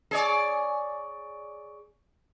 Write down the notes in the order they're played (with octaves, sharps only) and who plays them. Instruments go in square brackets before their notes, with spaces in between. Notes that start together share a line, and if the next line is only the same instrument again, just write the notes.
[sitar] G#4 C#5 D5